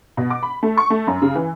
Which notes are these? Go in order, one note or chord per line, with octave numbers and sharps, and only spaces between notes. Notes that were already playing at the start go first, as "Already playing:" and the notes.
B2
D6
B5
A3
C#6
A3
F#2
C#3
E3